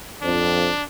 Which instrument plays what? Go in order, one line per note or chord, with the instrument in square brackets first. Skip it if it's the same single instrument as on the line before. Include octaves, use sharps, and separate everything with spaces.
[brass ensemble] F2 [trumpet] D4